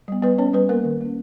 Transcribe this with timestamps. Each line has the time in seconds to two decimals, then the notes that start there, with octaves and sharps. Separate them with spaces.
0.08 G3 B3
0.22 G3 B3 B4
0.38 B3 C#4 C#5
0.53 G3 B3 B4
0.69 A#3 B3 A#4
0.84 D#3
1.01 A#3 C#4